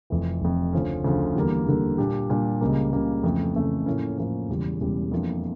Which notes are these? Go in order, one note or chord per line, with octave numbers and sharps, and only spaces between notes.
F1 F2 E3
F1 F2 E3
D2 C#3 F3 C#4
D2 C#3 F3 C#4
E2 D3 G3 A#3
E2 D3 G3 A#3
A#2 G3 D4 G4
A#2 G3 D4 G4
C#2 C#3 G3 A#3
C#2 C#3 G3 A#3
F2 C#3 E3 A3
F2 C#3 E3 A3
A2 F3 A#3 C#4
A2 F3 A#3 C#4
E1 E2 C#3 G3
E1 E2 C#3 G3
F2 E3 A#3 D4 F4